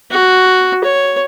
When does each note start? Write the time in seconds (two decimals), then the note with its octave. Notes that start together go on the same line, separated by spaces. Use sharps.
0.11 F#4
0.84 C#5